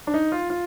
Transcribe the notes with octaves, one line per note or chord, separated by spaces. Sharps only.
D4
D#4
F4
F4